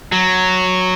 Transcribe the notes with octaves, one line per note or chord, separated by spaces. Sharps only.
F#3